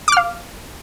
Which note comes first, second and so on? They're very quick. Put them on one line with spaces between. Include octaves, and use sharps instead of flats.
D6 F6 F5